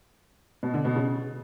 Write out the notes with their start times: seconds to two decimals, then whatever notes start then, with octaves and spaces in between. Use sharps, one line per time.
0.63 B2
0.74 D3
0.85 B2
0.96 C#3